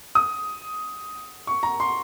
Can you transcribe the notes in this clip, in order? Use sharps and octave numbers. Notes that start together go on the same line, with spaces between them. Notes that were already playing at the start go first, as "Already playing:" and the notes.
D#6
C#6
A#5
C6